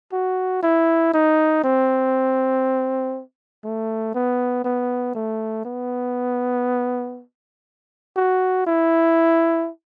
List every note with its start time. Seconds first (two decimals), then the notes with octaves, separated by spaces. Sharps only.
0.13 F#4
0.63 E4
1.14 D#4
1.64 C4
3.64 A3
4.15 B3
4.64 B3
5.15 A3
5.65 B3
8.16 F#4
8.67 E4